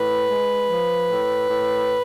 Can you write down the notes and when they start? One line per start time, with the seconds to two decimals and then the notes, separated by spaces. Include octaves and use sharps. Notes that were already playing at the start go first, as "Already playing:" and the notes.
Already playing: A2 B4
0.27 G#3
0.68 F3
1.08 A2
1.49 A2